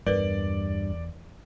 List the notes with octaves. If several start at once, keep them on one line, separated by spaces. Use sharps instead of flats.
E2 G2 A#4 B4 D5